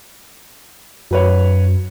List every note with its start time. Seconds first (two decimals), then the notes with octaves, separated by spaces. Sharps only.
1.11 F#2 F#3 B4 C#5